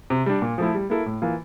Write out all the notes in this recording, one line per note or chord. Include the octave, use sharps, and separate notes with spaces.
C3
G3 D4
A#2
F3 A3 E4
G3
A#3 E4 A4
A2
E3 A#3 F4